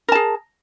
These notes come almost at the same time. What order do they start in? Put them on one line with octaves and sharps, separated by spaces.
A#4 A5 G#4